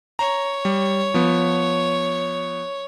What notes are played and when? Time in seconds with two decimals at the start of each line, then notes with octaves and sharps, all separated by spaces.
0.19 C#5 A#5
0.65 G3
1.14 F3 B3